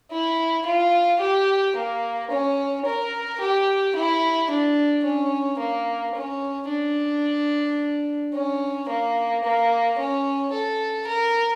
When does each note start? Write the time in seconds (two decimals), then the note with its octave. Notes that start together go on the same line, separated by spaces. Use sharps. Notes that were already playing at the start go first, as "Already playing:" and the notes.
0.11 E4
0.66 F4
1.21 G4
1.75 A#3
2.30 C#4
2.86 A#4
3.41 G4
3.95 E4
4.50 D4
5.05 C#4
5.59 A#3
6.15 C#4
6.69 D4
8.34 C#4
8.89 A#3
9.44 A#3
9.99 C#4
10.53 A4
11.07 A#4